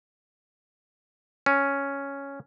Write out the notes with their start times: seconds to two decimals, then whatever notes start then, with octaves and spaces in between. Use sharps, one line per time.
1.46 C#4